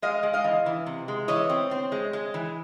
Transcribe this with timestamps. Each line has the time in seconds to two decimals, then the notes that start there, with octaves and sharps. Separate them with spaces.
0.02 G#3 D#5 F5
0.23 G#3
0.33 D#5 F5
0.44 E3
0.66 E3
0.86 C3
1.08 G#3
1.28 E3 C#5 D#5
1.50 C4
1.71 C4
1.92 G#3
2.13 G#3
2.34 E3